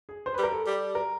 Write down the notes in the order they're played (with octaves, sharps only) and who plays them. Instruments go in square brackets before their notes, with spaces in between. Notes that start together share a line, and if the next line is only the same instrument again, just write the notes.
[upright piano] G#4
C5
B4
[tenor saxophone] G3
[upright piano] A#4
A4
[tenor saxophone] G3
[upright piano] A#4